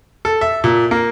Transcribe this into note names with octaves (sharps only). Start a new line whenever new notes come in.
A4
E5
A#2
A#3